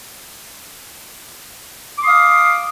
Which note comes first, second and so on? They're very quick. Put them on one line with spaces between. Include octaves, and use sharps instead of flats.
D6 C6 D#6 F5